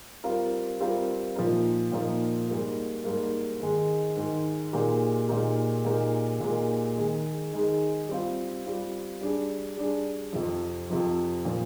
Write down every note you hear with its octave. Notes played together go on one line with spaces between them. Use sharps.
G3 C4 F4 A#4
G3 C4 F4 A#4
A#2 F3 A#3 D#4 A#4
A#2 F3 A#3 D#4 A#4
G#2 G3 A#3
G#2 G3 A#3
G#2 D#3 G#3
G#2 D#3 G#3
A#2 G#3 D#4 G4 A#4
A#2 G#3 D#4 G4 A#4
A#2 G#3 D#4 G4 A#4
A#2 G#3 D#4 G4 A#4
D#3 G#3 D#4 G#4
D#3 G#3 D#4 G#4
G3 C4 F4
G3 C4 F4
G3 D4 G#4
G3 D4 G#4
F2 C3 F3
F2 C3 F3
A#2 F3 C4